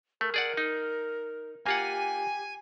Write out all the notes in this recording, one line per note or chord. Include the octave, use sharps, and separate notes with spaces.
A3 A#4
G#4 D5 F#5
D#4
A#3 F4 G4 F#5 G#5